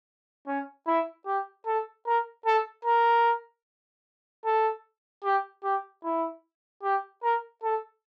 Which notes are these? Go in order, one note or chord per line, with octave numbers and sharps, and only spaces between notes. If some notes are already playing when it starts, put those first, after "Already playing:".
C#4
E4
G4
A4
A#4
A4
A#4
A4
G4
G4
E4
G4
A#4
A4